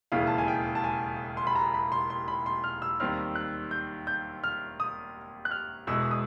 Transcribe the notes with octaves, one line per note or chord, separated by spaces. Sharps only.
E1 D#2 C#3 E3 F5
A5
G#5
G5
A5
G#5
C6
B5
A#5
B5
C6
C6
B5
C6
F6
E6
D#2 D#3 G3 C4 F6
F#6
G6
G6
F6
D#6
F#6
F6
E1 E2 B2 G#3 E6
D#6